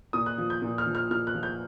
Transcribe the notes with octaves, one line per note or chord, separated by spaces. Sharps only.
A#2 D#6
F#6
F3
G6
A#2
F6
F3
F6
A#2 F6
F#6
F3
G6